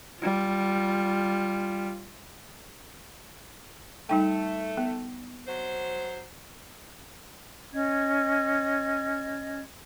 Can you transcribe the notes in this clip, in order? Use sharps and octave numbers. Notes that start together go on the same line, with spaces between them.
G3 F4
G3 A3 D#4 G5
B3
F#3 C5
C#4 D#5 G#6